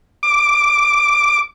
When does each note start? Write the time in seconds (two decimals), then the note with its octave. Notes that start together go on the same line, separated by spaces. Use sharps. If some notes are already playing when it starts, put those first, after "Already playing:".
0.23 D6